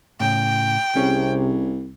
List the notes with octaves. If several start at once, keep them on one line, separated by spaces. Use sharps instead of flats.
A2 C#3 G5
C2 C3 C#4 G#4 C#5